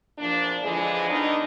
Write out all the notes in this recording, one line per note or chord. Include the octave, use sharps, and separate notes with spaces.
E2 A#2 F3 D4
D3 E3 F3 G#3
D#3 E3 B3 D4 D#4